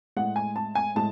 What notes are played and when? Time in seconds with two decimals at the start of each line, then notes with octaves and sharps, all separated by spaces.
0.16 A2 G#3 F#5
0.36 G#5
0.56 A5
0.75 G#5
0.95 A2 G#3 A5